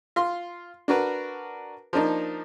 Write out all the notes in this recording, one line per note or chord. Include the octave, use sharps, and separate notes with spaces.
F4 C6
D4 F#4 A#4 B4
F3 A#3 D4 D#4